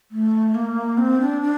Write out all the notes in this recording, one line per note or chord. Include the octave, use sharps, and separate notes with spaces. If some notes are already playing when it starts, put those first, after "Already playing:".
A3
A#3
C4
D4
D4